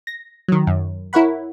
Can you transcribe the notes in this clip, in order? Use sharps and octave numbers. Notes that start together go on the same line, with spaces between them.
A#6
D#3 F#3
F#2
E4 A#4 C#5 F#5 B5